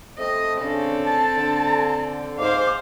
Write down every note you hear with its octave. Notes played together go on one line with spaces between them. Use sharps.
A3 C4 D#5
C#3 C4 D4 A4
A5
D3
G#2 C5 F5 D6